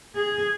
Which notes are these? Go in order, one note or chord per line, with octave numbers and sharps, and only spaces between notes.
G#4